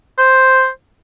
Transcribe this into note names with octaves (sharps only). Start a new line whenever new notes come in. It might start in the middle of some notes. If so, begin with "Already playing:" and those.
C5